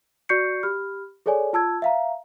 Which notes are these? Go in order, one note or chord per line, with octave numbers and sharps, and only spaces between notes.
F#4 D5 C#6 G6 C7 C#7
G4 B5 F6
G#4 A4 C#5 D5 G#5
F4 A5 E6 G#6
E5 F5 A#5